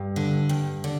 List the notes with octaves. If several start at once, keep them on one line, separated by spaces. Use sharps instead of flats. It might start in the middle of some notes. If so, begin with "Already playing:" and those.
Already playing: G2
D3
G2
D3